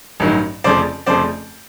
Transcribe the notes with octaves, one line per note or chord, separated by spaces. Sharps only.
A1 G2 D#3 F#3
F1 F2 C#3 F3 A3 C5 D5
F1 F2 C#3 F3 A3 C5 D5